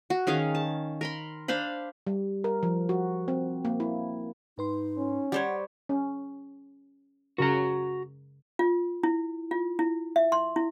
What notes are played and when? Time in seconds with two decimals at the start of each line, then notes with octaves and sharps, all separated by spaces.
0.10 F#4
0.27 D#3 C#4 G#4 F5
0.55 A5
1.01 A#4 B5 C6
1.48 D4 C5 F5 B5
2.07 G3
2.44 A#4
2.63 F3
2.89 F#4
3.28 C4
3.65 A#3
3.80 E4
4.58 G#2 D#4 B4 C6
4.97 C#4
5.32 G3 C5 C#5 F#5
5.89 C#4
7.38 C#3 F#4 A#4 A#5
8.59 F4
9.03 E4
9.51 F4
9.79 E4
10.16 E5
10.32 C6
10.56 E4